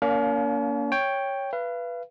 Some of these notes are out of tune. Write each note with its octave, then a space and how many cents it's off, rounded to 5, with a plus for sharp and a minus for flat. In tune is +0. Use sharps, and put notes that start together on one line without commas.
A#3 +0 C#4 +45 F5 +20
C#5 +0 G5 +5
B4 -5 F5 -40